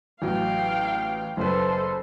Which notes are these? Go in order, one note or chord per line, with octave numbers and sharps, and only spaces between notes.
A1 F#3 F5 G5
F#1 A4 B4 C5